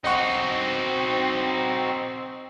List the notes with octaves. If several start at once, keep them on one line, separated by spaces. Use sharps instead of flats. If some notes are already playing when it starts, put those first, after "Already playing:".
C4 D#4 F#4 D#5 F#5 C#6